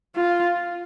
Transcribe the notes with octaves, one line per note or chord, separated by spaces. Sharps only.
F4